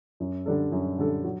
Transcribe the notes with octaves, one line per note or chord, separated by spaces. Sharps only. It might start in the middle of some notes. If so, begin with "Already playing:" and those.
F#2
D3 G3 D4 A4
F#2
D3 G3 D4 A4
F#3